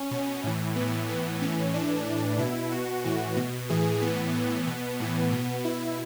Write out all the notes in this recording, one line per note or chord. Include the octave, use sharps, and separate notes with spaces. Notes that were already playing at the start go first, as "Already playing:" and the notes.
Already playing: C#4
B2
A2 E3
A2 E3 B3
A2 E3 B3
A2 E3 C#4
A2 E3 D4
A2 E3
B2 E4
B2 F#4
A2 E3
B2
A2 E3 G#4
A2 E3 B3
A2 E3
B2 B3
A2 E3
B2 B3
B2 E4